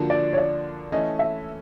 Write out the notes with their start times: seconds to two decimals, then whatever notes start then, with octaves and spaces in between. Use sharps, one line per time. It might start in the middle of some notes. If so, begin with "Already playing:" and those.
Already playing: D3 F3 A#3 D4 F#4
0.10 D5
0.33 C#5
0.38 D5
0.92 E3 A3 C#4 D#5
1.19 E5